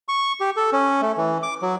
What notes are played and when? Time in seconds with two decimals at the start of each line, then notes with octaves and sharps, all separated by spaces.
0.08 C#6
0.40 G4
0.57 A4
0.73 C#4
1.02 A3
1.17 E3
1.43 D6
1.62 F#3